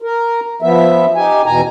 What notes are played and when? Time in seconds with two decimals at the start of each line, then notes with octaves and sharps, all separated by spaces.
0.02 A#4
0.62 F3 B3 E5
1.16 D#4 G4 G#5
1.46 E2 B2 G#5 A#5